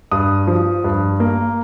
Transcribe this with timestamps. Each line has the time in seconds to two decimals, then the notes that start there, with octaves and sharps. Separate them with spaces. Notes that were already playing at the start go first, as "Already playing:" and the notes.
0.11 G2 D#6
0.47 F3
0.84 G2
1.20 A#3